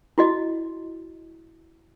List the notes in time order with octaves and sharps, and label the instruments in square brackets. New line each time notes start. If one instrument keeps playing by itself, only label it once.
[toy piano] E4 F#4 D#5